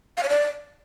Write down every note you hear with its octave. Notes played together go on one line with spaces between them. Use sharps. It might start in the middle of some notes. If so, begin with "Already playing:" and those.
F5
C#5
D5